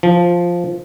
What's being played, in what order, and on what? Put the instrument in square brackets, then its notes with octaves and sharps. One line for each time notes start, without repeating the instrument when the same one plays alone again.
[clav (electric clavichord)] F3